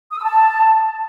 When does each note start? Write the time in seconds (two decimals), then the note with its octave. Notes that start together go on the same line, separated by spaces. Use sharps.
0.11 D#6
0.17 E6
0.23 A5